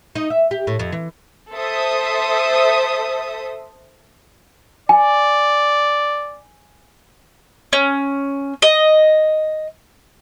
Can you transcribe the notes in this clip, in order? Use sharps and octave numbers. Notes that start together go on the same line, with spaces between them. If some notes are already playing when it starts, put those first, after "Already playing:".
D#4
E5
G4
A2
F2
E3
A4 C5 E5 D#6
D5 G#5
C#4
D#5